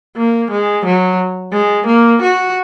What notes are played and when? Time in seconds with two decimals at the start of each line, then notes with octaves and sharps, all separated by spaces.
0.17 A#3
0.51 G#3
0.85 F#3
1.53 G#3
1.87 A#3
2.22 F#4